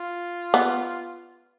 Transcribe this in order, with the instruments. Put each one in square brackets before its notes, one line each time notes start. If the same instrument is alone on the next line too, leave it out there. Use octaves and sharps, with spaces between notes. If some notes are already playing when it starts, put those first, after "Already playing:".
Already playing: [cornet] F4
[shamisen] B3